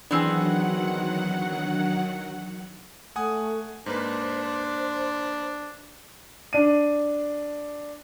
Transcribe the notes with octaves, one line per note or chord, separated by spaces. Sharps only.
D#3 E3 F#3 B3 C4 D4 G#4 F#5
A3 F#5 G#5 D#6
G#2 A#3 D4 B4 C5
D4 D#7